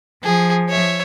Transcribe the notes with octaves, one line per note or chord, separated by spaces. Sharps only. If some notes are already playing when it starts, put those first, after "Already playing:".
F3 G#4
C#5 E5